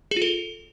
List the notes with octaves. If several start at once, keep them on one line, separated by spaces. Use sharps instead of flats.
G#4
F4
A4